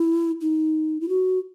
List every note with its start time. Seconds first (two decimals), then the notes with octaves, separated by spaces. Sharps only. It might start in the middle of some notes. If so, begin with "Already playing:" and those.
Already playing: E4
0.41 D#4
1.01 E4
1.09 F#4